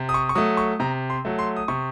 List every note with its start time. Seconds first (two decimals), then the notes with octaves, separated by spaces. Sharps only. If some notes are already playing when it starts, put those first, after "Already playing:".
Already playing: C3
0.09 D#6
0.14 C#6
0.29 C#6
0.35 F#3 A3 D#6
0.57 C#6
0.80 C3 A#5
1.10 C6
1.25 F#3 A3
1.39 C6
1.56 D#6
1.68 C3 C#6